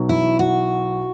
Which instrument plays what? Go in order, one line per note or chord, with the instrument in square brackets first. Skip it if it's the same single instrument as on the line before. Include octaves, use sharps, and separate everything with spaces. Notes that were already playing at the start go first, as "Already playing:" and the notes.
Already playing: [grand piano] B1 B2 F#3
[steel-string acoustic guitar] E4
F#4